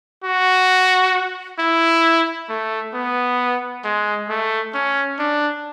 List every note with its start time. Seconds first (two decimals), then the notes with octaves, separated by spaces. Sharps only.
0.24 F#4
1.59 E4
2.49 A3
2.94 B3
3.84 G#3
4.29 A3
4.74 C#4
5.19 D4